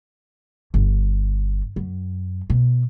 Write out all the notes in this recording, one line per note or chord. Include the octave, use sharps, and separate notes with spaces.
G1
F#2
B2